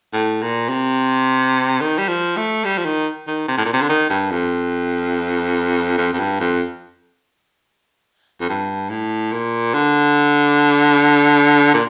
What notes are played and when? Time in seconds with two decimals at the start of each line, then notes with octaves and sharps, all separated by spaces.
0.13 A2
0.42 A#2
0.69 C3
1.81 D#3
1.98 G3
2.08 F3
2.37 A3
2.65 G3
2.78 F3
2.85 D#3
3.27 D#3
3.48 C3
3.57 A2
3.65 A#2
3.73 C3
3.81 D3
3.89 D#3
4.10 G2
4.31 F2
5.97 F2
6.13 F2
6.19 G2
6.40 F2
8.41 F2
8.49 G2
8.90 A2
9.32 A#2
9.74 D3
11.74 A#2